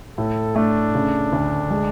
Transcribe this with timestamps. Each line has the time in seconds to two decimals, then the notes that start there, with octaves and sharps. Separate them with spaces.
0.18 A2 A4
0.56 A3 D4
0.95 C#3
1.33 D2
1.71 G#3